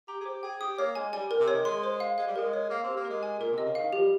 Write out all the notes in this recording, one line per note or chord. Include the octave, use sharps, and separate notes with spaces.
G4 A#5
G#4
G4 C5
G#4 G5
G4 D#6
A#3 C#5
G#3 G#5
G3 G#5
A#4
C3
D#3 C#5
G#3 C6
C5
F5
G#3 F5
G3
G#3 A#4
C#5
A#3 F5
C4 G4
A#3
G#3 A#4
G#5
A#2 A#4
C3
D#5
C#3
D#3 F5
F3 G4
G3